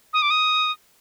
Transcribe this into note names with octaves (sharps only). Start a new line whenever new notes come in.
D#6
D6
D#6